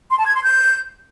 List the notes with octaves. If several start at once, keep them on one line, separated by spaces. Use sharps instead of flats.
C6
A5
G#6
C6
G6